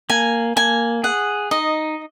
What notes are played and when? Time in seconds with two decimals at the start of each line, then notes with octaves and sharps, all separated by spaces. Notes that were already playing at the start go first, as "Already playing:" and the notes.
0.10 A#3 G#5
0.56 A#3 G#5
1.04 G#4 F#5
1.51 D#4 D#5